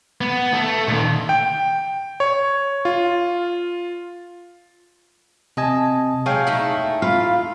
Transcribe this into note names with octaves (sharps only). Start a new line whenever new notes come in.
B3
A3
A#2 D#3
G5
C#5
F4
C3 D#5 G#5 A5
F#3 G#3 C#5 F5 G5 G#5
A3 D#4 E4
F4 F5 B5